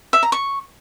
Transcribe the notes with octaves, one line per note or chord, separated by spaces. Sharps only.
E5
A#5
C#6